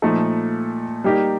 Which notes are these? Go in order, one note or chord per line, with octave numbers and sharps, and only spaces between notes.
A#2 F3 A3 D#4 A4
G3 A#3 D#4 G4 A#4